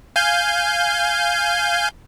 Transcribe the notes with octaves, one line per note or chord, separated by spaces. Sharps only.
F5 G#5 G6